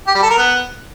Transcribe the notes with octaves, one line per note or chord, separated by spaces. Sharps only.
G4
G3
A4
A#4
B3